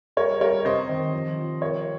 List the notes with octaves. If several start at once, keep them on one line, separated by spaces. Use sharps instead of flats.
G3 A#4 C#5
G3 A#4 C#5
C3 C5 D#5
D#3
F3
F3
G3 A#4 C#5